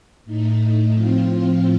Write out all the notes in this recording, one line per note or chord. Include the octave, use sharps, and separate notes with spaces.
A2 A3 D#4
A2 F3 C4 F4